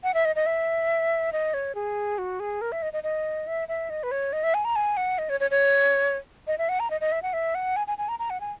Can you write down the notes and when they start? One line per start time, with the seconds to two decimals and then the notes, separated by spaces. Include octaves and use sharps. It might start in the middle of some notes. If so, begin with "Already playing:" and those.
0.04 F#5
0.14 E5
0.25 D#5
0.36 D#5
0.46 E5
1.33 D#5
1.54 C#5
1.75 G#4
2.18 F#4
2.40 G#4
2.61 A#4
2.72 E5
2.82 D#5
2.93 D#5
3.03 D#5
3.47 E5
3.68 E5
3.90 D#5
4.03 B4
4.11 C#5
4.33 D#5
4.44 E5
4.54 G#5
4.65 A#5
4.76 G#5
4.97 F#5
5.18 D#5
5.29 C#5
5.40 C#5
5.51 C#5
6.47 D#5
6.58 E5
6.69 F#5
6.80 A#5
6.90 D#5
7.01 D#5
7.12 E5
7.22 F#5
7.33 E5
7.55 F#5
7.76 G#5
7.87 G#5
7.98 G#5
8.09 A#5
8.19 A#5
8.30 F#5
8.41 G#5